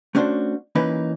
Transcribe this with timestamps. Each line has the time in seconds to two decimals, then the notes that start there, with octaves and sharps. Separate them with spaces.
0.15 A3 C#4 D4 F#4 C5
0.75 E3 A#3 C#4 D#4 B4